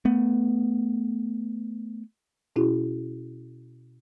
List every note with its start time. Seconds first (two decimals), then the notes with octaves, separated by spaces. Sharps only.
0.05 A3 B3
2.56 B2 C#4 E4 F#4 G#4